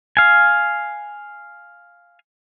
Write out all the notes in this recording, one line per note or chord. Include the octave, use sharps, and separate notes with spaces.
F5 G#5